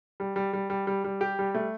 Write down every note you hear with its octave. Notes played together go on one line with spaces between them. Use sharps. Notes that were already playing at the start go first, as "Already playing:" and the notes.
G3
G3
G3
G3
G3
G3
G4
G3
A3